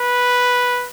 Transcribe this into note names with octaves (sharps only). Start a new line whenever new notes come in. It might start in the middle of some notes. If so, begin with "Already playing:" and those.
Already playing: B4